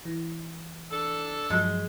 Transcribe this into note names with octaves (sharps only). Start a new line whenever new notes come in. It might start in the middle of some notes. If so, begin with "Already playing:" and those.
E3
D4 A4
G2 F3 F#3 G#3